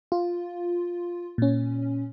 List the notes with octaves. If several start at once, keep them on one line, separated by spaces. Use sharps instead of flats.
F4
A#2 C#4